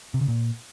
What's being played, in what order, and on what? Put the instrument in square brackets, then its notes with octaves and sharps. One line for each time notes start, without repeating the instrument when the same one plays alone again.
[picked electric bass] C3
C#3
A#2